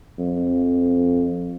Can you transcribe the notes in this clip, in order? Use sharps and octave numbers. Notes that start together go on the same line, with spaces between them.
F2